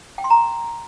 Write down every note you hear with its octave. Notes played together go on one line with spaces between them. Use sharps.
G5
C6
A#5